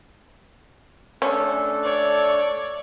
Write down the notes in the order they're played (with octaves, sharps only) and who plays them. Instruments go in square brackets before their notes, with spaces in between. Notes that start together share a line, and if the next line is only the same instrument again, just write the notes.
[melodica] A3 D4 A4 [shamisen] C#4
[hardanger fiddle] C#5 D5